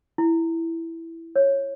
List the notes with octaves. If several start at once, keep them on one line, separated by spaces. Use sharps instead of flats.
E4
C#5